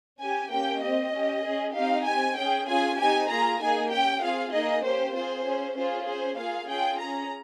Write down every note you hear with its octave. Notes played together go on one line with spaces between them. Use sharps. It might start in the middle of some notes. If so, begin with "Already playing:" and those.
C#4 G4 G#5
A#3 C#4 G4 G5
C4 G4 D#5
C#4 G4
C#4 G#4
C4 D#4 G4 F5
C4 G4 G#5
C#4 G#4 G5
C#4 F4 G#4 G#5
C4 D#4 G4 G#5
A#3 F4 G#4 A#5
A#3 D#4 G#4 G#5
C#4 G4 G5
C4 F4 G#4 F5
A#3 D#4 G#4 D#5
A#3 C#4 G4 C5
C4 F4 G#4 C5
C#4 G#4
C#4 F4 G#4 C5
C#4 G#4 C5
A#3 F4 G#4 F5
C#4 F4 G#4 G5
C#4 G#4 A#5